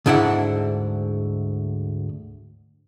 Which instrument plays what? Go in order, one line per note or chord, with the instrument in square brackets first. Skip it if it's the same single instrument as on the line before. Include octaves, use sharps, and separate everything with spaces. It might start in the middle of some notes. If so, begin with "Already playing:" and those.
[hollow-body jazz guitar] D2 G#2 D4 E4 E5 F#5